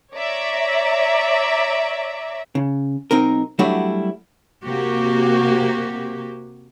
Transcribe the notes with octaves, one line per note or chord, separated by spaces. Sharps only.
C#5 D5 E5 A#5
C#3
B1 C4 D#4 A#4
F#3 G3 A3 D4 E4 F#4
C3 A#3 F#4 G4